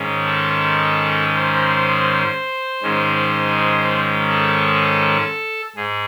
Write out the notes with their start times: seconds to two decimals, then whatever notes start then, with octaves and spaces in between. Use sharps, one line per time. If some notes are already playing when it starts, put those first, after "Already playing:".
Already playing: G#2 D#3 G#3 C#4
0.25 A4
1.36 C5
2.83 G#2 D#3 G#3 C#4
4.29 A4
5.76 G#2 G#4